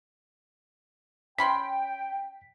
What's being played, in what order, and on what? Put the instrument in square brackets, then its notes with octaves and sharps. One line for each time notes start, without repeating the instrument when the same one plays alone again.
[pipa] C#4 B5 C6 [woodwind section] G5 [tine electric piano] B6